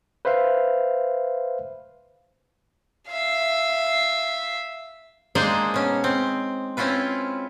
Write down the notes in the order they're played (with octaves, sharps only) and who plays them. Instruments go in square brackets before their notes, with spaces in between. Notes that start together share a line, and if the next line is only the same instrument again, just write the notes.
[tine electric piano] B4 C5 E5 F5
[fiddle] E5 F5
[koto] G#3 A#3 D4 D#4 G#4 C5
B2 C#4
C4
C4 C#4 E4 F4 B4